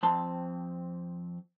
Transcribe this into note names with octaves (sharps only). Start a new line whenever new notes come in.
F2 C4 A5 C6